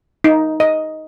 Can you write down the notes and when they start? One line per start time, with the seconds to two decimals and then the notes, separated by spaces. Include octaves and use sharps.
0.24 D#4
0.60 D#5